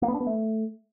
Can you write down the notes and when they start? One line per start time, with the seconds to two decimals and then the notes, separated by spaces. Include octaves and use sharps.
0.02 A#3
0.08 B3
0.14 D4
0.21 B3
0.27 A3